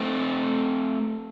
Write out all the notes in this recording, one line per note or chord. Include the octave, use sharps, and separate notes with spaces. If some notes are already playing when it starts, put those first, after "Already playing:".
Already playing: A3 C4